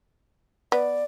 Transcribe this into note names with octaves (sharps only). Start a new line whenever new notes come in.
B3 D5